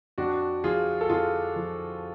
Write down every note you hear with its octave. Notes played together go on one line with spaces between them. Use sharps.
F2 D4 F#4
F3 F4 G#4
A4
F2 F4 G#4
F3